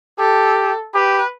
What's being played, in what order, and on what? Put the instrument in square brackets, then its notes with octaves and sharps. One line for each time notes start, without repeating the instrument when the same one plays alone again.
[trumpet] G4 [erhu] A4
[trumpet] G4 [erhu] B4